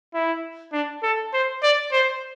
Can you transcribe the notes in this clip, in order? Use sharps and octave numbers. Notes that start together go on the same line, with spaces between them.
E4
D4
A4
C5
D5
C5